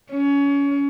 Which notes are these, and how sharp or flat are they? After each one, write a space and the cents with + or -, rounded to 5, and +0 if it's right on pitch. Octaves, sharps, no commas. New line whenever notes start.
C#4 +25